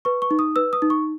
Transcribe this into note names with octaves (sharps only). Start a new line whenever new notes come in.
B4 C#6
C#6
D#4
D#6
B4 E6
D#6
D#4
C#6